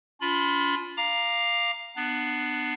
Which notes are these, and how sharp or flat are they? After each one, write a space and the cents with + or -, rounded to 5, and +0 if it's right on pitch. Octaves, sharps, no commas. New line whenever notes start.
C#4 +45 F4 +0 B5 +0
F5 +0 A#5 +5 D6 +15
B3 +0 D4 +25